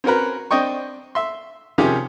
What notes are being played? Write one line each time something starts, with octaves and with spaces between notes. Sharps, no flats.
C4 C#4 F#4 A#4 B4
C4 D4 D#5 G5 C#6
E5 C6
C3 D#3 F3 C#4 G4 G#4